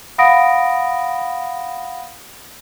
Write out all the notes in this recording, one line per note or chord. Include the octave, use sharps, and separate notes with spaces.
F5 F#5 B5 D#6 A#6 D7